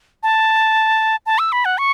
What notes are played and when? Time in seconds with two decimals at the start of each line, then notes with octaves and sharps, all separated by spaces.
0.23 A5
1.26 A5
1.39 E6
1.52 B5
1.65 F#5
1.78 C#6